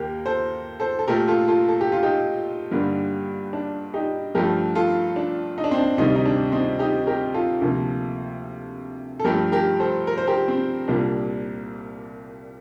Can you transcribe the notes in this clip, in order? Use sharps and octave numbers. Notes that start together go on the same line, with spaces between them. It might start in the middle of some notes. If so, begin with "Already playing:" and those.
Already playing: D#2 A#3 G4 A#4
A4 C5
A4 C5
A4
A#2 A3 G4 A#4
F4 A4
F4 A4
A4
G4
F4
D#4 G4
G2 D3 G3 A#3
D4
D#4 G4
G2 F3 A3 G4 A#4
F4 A4
D4
D#4
D4
C4
D4
D2 C3 D#3 G3 C4 D#4
D#4
D4
C4 D#4
D#4 G4
G4 A#4
F4 A4
D2 C3 F3 A#3
A4
G2 F3 A3 G4 A#4
G4 A#4
A4 C5
A#4
C5
G4 A#4
C4
C2 A#2 G3 A#3 D4